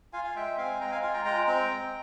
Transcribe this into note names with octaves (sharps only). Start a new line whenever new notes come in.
F4 F5 G#5
F5 G#5
G#3 E5 G5
C4 F5 G#5
G#3 G5 A#5
F5 G#5
F4 F5 G#5
G5 A#5
G#3 G5 A#5
C4 G5 A#5
G#3